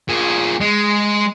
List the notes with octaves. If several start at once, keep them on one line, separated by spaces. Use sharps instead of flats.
A#2 G#4
G#3